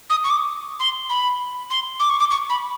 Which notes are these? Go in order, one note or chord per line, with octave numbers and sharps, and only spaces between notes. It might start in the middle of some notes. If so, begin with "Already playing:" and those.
D#6
C#6
D6
C6
B5
C6
D6
C#6
D6
C#6
B5